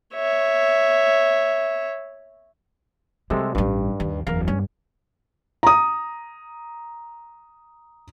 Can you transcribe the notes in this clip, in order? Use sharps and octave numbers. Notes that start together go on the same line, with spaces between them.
C#5 E5
C3 G3 G#3 A4
A1 G2 G3
D#2
F#1 E2 A#4 F5
G2 C#4
A#5 D#6